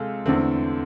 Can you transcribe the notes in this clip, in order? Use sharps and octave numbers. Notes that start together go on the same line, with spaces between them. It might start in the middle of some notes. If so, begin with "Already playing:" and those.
Already playing: C3 G#3 C4 F4 G#4 A4
E2 D3 A3 C4